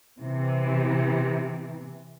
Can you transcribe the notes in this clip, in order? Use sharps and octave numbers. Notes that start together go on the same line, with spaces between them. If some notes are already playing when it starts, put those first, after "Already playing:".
C3 E3